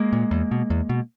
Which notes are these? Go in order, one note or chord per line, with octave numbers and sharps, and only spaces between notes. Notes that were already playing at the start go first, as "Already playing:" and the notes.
Already playing: G#3 A#3
A#2
E2
B2
E2
B2